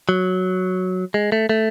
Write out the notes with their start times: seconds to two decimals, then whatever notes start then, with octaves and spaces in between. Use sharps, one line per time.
0.09 F#3
1.14 G#3
1.32 A3
1.49 A3